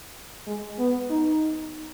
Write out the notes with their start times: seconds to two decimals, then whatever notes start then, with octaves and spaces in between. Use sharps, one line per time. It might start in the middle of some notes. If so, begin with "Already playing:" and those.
0.47 G#3
0.79 B3
1.10 D#4